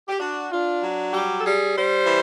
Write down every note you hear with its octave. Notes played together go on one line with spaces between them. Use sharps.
G4
D4 F#4
D4 F4
F#3
G3 G4
A4
G3 G#4
G3 C5
E3